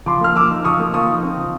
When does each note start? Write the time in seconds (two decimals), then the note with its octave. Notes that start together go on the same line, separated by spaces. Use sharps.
0.06 F3 C6 D6
0.21 A#3 F6
0.36 F3 D6 E6
0.50 D#4
0.65 F3 C#6 D#6
0.79 A#3
0.93 F3 C#6 D#6
1.09 D#4
1.23 C4
1.37 F3